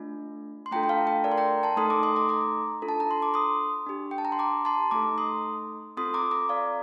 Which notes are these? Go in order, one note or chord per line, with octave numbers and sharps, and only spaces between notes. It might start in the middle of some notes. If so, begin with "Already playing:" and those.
Already playing: A3 D4 F4
C6
A3 D4 F4 A4 G5 A#5
G5
F5 A5
G5 A#5
A#4 D5
C6
G5 A#5
A5 C6
A3 D#4 A4 C6 D#6
A#5 D6
C6 D#6
A#5 D6
A#5 D6
D4 F4 A4
A5
A#5
C6
D6
C6 D#6
D4 G4
G5
A5
A#5
C6
A#5 D6
A5 C6
A3 D#4 A4 A#5 D6
C6 D#6
C4 F4 A4 C6 D#6
A#5 D6
A#5 D6
D5 F5